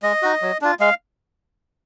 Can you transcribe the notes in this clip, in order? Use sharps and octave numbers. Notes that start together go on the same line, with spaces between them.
G#3 D#5
D#4 F#4
F#3
D4 F4
G#3 F5